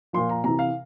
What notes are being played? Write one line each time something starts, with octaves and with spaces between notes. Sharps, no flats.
A#2 F3 C6
A#5
C3 E3 A#5
F5